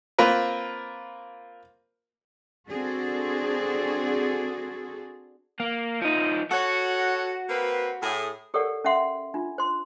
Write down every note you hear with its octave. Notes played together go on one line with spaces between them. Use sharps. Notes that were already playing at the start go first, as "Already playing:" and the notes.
A#3 C4 F4 A#4 B4
C4 D4 F#4 G#4 A4
A#3
F3 D#4
F#4 A4 C#5 F#5
A#3 C4 B4
A2 G#4
G4 A4 A#4 C#5 D5 F#5
C#4 E5 F#5 C6
D4 F4
C5 C6